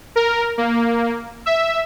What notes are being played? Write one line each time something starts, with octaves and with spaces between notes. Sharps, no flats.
A#4
A#3
E5